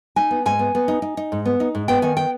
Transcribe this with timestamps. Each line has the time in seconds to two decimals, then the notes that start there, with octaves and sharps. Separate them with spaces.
0.16 D#4 G#5
0.31 B3
0.46 G#2 G#5
0.59 B3
0.75 B3
0.88 D#4
1.02 D#4
1.17 D#4
1.32 G#2
1.45 B3
1.60 D#4
1.75 G#2
1.88 B3 G5
2.02 D#3 G#5
2.17 B3 G5